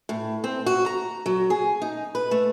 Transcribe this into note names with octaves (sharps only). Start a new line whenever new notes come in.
A2
C4
F#4
A#5
F#3
G#4
D#4
B4
A3